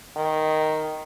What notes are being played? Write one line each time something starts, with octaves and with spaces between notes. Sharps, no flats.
D#3